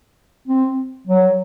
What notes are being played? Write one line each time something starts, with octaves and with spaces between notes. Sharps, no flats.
C4
F#3